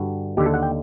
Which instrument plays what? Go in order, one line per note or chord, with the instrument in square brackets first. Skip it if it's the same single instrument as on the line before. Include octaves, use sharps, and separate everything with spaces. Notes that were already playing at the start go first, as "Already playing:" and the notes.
Already playing: [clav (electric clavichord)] G2 D3 F#4
D#2 D3 G4
A4
F#5
G5